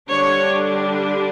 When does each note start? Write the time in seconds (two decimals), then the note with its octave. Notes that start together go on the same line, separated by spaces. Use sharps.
0.11 D3 G3 D4 C#5